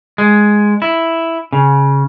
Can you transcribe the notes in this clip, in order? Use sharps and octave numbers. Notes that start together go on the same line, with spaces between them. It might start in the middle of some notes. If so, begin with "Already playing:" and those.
G#3
E4
C#3